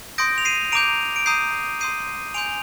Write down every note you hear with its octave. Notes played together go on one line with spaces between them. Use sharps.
C6 D#6 G6 A#6 D7
F7
C7 D#7
A#5 D6 G6 D7 F7
D7
A#5 D#6 G6 C7 D#7
C6 D#6 G6 C7 D#7
G#5 C6 G6 D7 F7